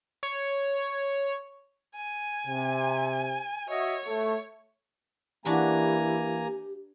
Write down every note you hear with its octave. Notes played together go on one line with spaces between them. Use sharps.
C#5
G#5
C3
F#4 C#5 D#5 E5
A3
E3 A#3 D4 F#4 G4 B4 G#5 A#5